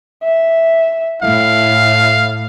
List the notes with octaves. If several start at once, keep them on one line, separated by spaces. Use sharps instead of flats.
E5
A2 E4 F5